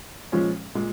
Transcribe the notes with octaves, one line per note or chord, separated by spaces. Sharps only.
A#2 F3 G#3 C#4
A#2 G#3